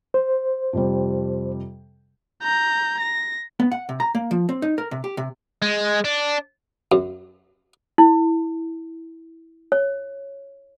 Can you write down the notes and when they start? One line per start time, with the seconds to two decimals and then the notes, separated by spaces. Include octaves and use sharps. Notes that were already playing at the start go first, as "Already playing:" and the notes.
0.14 C5
0.73 F2 C3 G3
2.43 A#5 G6
3.00 A#6
3.60 B3
3.72 F#5
3.89 C3
4.00 A#5
4.15 A#3
4.31 F3
4.49 C4
4.62 D#4
4.78 A#4
4.91 C3
5.04 G4
5.17 C3
5.62 G#3
6.04 D4
6.92 F#2
7.98 E4
9.72 C#5